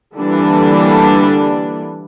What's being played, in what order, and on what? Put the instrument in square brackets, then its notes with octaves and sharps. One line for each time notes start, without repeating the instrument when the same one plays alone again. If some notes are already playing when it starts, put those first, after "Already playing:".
[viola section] D3 E3 G3 A#3 D4